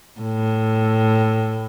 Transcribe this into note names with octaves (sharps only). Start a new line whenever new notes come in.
A2